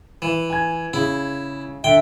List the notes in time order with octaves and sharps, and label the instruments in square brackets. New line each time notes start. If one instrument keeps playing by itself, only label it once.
[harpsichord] E3
[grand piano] G#5 G#6
[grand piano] C#3 [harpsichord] E4
[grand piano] D3 [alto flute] E5 [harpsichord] G5